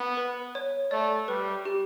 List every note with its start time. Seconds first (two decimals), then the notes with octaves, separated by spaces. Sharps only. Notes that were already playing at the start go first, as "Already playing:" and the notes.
Already playing: B3
0.17 B4
0.55 C#5
0.91 A3 D5
1.28 G3 B4
1.65 G4